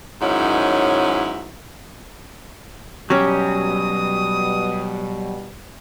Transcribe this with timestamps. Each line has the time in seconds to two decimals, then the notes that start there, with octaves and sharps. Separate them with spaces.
0.21 G#2 D#3 F#3 C#4 E4
3.10 B2 F#3 G3 C#4 G4 D#6